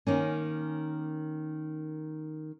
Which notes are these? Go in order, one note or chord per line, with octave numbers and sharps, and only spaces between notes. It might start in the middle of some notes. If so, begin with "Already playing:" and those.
D#3 A#3 C#4